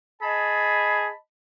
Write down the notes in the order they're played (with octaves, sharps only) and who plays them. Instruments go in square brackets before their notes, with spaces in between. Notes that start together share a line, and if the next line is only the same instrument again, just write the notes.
[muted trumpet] G#4 [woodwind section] D#5 A5 B5